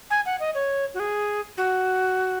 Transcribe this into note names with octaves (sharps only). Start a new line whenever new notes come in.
G#5
F#5
D#5
C#5
F#4
G#4
F#4